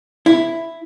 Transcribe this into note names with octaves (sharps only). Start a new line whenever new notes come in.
E4